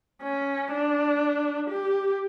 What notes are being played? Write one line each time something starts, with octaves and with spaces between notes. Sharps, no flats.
C#4
D4
G4